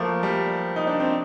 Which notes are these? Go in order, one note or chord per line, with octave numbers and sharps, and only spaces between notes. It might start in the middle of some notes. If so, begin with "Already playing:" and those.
Already playing: F3 A3 A#3
G3
D#4
D4
C4